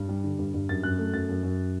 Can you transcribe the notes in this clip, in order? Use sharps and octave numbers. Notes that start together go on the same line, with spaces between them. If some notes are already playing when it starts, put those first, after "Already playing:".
Already playing: G2
G3
D3
G2
G2
F#2 A6
F#2 F#6
A3
F#2 A6
F#2
F#2